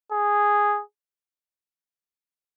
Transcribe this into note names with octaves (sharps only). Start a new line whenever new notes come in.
G#4